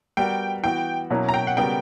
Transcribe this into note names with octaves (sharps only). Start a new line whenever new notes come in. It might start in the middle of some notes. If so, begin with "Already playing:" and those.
G3 B3 F#4 A#4 G5
E3 B3 F#4 G5
B2 F#3 A#3 C#4 E4
A#5
G5
F#5
C#3 G3 B3 F#4 A#4 G5